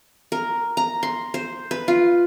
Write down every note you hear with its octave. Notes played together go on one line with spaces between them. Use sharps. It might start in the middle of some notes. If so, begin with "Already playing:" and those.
A#4
A#5
C6
C5
B4
F4